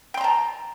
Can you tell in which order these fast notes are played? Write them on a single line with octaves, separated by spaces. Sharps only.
G5 C6 A#5 A5